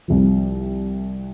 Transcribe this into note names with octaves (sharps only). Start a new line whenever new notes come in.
C2 C3 F3